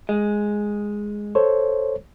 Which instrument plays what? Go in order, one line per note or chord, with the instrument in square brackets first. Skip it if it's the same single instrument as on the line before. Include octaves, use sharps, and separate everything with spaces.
[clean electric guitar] G#3
[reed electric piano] A4 C5 C#5